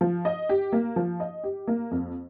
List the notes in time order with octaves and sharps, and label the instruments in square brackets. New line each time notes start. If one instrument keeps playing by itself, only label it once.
[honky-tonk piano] F3
D#5
G4
A#3
F3
D#5
G4
A#3
F2